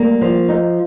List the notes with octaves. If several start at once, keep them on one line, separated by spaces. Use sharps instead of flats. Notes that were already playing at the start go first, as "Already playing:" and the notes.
Already playing: G3 A#3
F3
D#4